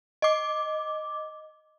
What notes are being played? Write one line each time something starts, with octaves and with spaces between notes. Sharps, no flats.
D#5 D6